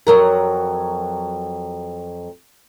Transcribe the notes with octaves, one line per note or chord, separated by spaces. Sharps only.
F2 F#3 A#4